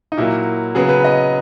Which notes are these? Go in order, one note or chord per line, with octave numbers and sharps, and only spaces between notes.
D#4
A#2 F#3 A#3 E4
C#3 F#3 B3 G#4
B4
D#5